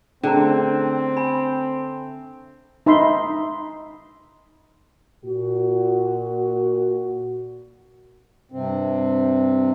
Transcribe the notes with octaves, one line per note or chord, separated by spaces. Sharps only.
D3 A3 C4 C#4 G#4 A#5
G#5 B5
D#4 E5 B5 C6
A#2 F#4
G2 C3 C4